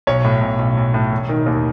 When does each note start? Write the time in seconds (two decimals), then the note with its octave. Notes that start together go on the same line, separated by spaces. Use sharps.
0.07 B1 C#5
0.24 A2
0.41 B1
0.59 B1
0.77 B1
0.94 A2
1.12 E1
1.29 D#3
1.46 D#2